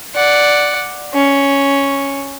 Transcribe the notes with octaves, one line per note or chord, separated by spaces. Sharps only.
D5 F#5
C#4